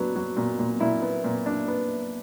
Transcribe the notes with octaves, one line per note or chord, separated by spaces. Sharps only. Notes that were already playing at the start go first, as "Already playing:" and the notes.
Already playing: A#2 F#3 B3 D4
F#3
A#2
A#2
A#2 E4
B3
A#2
D4
B3